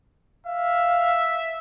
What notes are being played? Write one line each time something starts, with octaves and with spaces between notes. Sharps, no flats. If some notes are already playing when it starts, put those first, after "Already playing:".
E5 F5